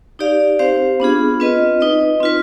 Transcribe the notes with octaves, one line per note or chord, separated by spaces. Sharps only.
D#4 G4 D5 F5
C4 G4 C5 F5
B3 D4 F4 G#4
C4 F4 B4 D#5
D#4 B4 D#5
C4 F4 B4